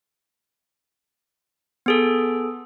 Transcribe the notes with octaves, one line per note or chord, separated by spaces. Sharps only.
B3 G#4 A4